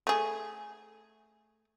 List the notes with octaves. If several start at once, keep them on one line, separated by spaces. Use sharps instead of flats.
A3 G#4